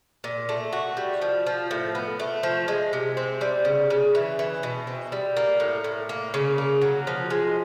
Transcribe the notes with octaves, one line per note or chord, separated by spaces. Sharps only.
A#2
A3
F#4
G3
F3
F3
A2
B3
A3
F3
G#3
C3
C4
G3
C#3
C#3
E3
E3
B2
C4
G3
A#3
A2
A2
A#3
C#3
A#3
F#3
F3
G#3